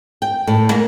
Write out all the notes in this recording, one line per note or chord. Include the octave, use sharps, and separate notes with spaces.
G5
A2
A#3